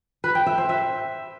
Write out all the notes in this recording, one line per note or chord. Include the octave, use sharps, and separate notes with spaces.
B4
G5
E5
C5
E5